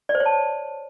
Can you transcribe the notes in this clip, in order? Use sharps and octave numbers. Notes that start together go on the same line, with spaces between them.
D5
C5
C#5
A5